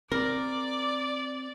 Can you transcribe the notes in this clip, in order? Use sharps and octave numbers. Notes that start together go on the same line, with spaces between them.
C4 A#4 D5